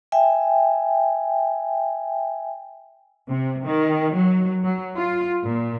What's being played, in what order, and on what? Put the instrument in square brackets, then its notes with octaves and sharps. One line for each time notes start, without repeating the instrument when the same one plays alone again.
[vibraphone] E5 G5 G#5
[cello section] C3
D#3
F#3
F#3
F4
A#2